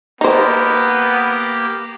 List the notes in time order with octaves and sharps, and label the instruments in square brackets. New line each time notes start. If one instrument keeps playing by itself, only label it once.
[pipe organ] A#3 G4 [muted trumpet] B3 [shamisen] D#4 C5